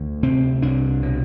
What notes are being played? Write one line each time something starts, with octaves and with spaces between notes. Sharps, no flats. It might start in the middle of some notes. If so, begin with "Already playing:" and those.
Already playing: D2
C3 C4
C2 D4
B2